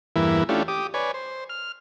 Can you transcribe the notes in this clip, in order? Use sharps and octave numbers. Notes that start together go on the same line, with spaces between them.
E2 G2 E3 A#3 E4 B4
A3 C#4 D4 E4 F4 G4
G4 D6 D#6
B4 C#5 D5 G#5
C5
F6